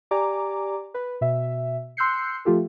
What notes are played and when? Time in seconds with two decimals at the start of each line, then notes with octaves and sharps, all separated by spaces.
0.11 G4 D5 G#5 A#5 D6
0.94 B4
1.21 B2 E5
1.97 C6 E6 F#6 G6 C7 C#7
2.45 F3 A3 F4 G4 A4